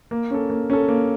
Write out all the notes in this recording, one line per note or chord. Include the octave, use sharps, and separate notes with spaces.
A#3
C#4 A4
A#3
C#4 A4
A#3